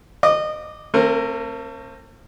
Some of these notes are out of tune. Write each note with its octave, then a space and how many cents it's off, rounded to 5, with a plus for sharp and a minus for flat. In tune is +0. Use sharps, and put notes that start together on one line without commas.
D#5 -25 D6 +0
A3 +40 C4 +35 A#4 +0